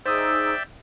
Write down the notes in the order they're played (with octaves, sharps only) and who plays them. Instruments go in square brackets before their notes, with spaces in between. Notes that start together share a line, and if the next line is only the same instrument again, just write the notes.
[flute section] D#4 G#4 E6 [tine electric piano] C5 D#6 [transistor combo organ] D5 E5 G5